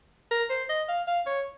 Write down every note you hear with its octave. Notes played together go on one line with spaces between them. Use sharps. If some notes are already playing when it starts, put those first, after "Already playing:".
A#4
C5
D#5
F5
F5
C#5